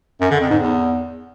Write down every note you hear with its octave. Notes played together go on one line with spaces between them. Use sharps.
F#2
D3
F2
G#2
E2